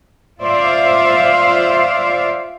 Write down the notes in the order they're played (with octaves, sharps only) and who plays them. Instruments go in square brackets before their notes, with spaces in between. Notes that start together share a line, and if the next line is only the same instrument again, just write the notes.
[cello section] F4 C5 D5 E5 F5